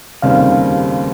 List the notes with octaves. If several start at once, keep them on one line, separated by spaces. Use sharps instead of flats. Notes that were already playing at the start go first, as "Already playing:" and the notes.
F1 D#2 C#3 G3 C4 F5